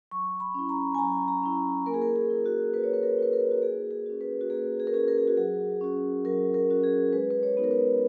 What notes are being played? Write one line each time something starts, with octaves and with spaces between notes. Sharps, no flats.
F#3 C#6
B5
C#4 E4
A#5
G#5
F#3 A#5
A#5
C#4 E4
A#3 A#4
G#4
A#4
G#4
E4
F#4
A#3 B4
C#5
B4
A#4
E4 B4
A#4
F#4
A#3 G#4
G#4
C#4 F#4
B4
F#4
A#3 G#4
G#4
A#4
C#4 F#4 G#4
A#4
G#4
F#4
F#3 G#4
C#4 F#4
F#3 A#4
A#4
C#4 F#4
G#4
G#3 B4
B4
C#5
B3 D#4 F#4
A#4
B4